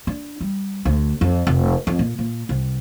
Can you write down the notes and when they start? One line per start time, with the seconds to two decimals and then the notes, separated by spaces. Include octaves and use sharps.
0.07 D4
0.41 G3
0.85 D2
1.21 F2
1.47 F1
1.87 F2
1.99 A#2
2.19 A#2
2.49 C2